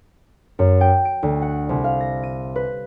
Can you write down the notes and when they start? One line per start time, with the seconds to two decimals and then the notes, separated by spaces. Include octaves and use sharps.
0.59 F#2
0.81 G5
1.05 D7
1.23 D2
1.42 F#5
1.69 C2
1.84 F5
2.00 A#6
2.23 D#7
2.56 B4